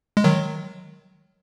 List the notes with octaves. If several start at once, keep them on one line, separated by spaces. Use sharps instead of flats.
G#3
D#3 F#3